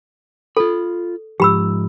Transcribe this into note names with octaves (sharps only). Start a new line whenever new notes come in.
F4 A4 B5
G#2 F3 G4 B5 E6